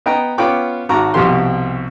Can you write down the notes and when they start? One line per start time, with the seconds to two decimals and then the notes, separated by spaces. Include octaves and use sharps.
0.06 B3 D#5 G5 A#5
0.38 B3 C#4 F4 G5 B5 D6
0.89 G#1 F#4 A#5 D6
1.14 C2 B2 F3 G4 C6